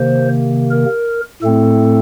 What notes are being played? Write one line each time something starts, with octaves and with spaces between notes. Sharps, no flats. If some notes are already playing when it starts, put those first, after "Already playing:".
Already playing: C3 D#3 A#3 C5
A#4
A2 A3 C4 A4